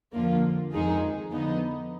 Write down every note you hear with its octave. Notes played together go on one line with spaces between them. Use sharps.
F2 D3 F3 A#3 F4
F2 D#3 G#3 D#4 G#4
D3 F3 B3 D#4